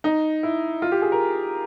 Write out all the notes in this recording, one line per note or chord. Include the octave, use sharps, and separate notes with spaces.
D#4
E4
F4
G4
G#4
A#4